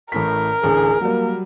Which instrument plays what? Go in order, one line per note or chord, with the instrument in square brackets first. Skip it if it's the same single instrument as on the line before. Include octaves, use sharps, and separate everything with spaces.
[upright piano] A1 A2 B6 [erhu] A#4
[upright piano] A1 D2 D3 [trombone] G#4
[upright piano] F#3 G3 [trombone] A#3